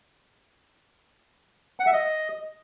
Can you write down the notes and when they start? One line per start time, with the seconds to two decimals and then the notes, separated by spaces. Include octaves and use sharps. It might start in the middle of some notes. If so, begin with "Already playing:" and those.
1.80 F#5
1.86 E5
1.93 D#5